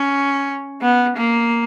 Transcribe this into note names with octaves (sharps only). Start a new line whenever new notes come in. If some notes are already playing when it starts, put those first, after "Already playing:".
Already playing: C#4
B3
A#3